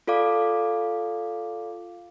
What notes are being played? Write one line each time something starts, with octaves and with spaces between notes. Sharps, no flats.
F4 A4 D5 F5 D6